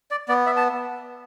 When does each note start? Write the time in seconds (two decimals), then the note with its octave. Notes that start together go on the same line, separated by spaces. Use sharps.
0.11 D5
0.28 B3 D5
0.46 E5
0.57 A5